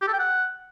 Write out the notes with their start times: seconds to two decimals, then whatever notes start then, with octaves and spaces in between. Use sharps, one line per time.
0.02 G4
0.07 A4
0.13 G5
0.19 F#5